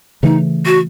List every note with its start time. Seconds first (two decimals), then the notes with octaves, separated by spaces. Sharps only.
0.23 C#3 E3 A3 D#4
0.66 F#4